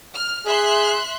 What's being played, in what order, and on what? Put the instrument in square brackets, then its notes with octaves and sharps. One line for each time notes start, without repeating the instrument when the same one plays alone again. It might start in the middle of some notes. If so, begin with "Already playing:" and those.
[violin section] F6
[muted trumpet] G#4 [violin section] E5 C6 F#6